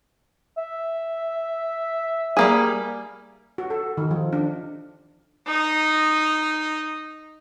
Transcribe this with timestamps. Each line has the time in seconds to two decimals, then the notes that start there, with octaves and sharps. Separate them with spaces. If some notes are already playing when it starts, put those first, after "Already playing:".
0.58 E5
2.37 G3 A#3 G#4
3.58 F#4
3.70 A4
3.98 D#3
4.11 F3
4.33 D4
5.47 D#4 D#5